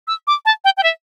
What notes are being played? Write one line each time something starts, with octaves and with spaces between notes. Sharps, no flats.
E6
D6
A5
G5
G5
E5